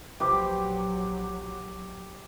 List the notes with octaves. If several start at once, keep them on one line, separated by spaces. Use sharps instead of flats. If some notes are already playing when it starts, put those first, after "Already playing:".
A#1 F#3 G4 B4 C5 D6